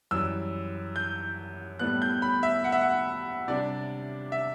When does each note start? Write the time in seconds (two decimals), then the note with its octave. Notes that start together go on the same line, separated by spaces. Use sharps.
0.11 F#2 E3 G3 E6
0.96 G6
1.79 A2 G3 B3 F#6
2.02 G6
2.22 B5
2.43 E5
2.64 F#5
2.72 E5
2.81 F#5
3.48 C3 G3 D4 D5
4.32 E5